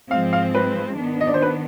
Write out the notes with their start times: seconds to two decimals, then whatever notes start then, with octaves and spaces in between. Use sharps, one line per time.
0.11 G#2 F3 G#3 C4 F5
0.33 F5
0.55 B4
0.98 D#3 B3 D4
1.21 D#5
1.27 D5
1.34 C5
1.42 B4